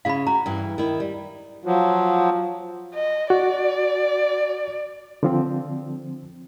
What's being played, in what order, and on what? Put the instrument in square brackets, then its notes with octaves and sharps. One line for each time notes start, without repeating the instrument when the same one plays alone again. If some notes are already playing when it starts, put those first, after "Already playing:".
[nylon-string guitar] C#3 E4 [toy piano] F5 B5
[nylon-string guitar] F#4 [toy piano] A#5
[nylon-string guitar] G2 E3
D#3 E4
G3
[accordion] F3 F#3 [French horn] F4
[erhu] D#5
[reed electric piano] F#4 [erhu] D5
[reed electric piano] D3 F3 C4